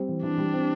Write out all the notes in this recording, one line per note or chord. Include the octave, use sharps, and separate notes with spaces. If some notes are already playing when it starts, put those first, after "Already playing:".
Already playing: G3 C4
E3
E3 D4
G3
C4